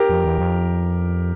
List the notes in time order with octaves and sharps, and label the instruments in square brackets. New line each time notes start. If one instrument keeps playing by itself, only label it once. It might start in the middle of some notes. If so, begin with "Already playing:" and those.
Already playing: [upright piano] G4 A#4
[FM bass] F2
E2
F2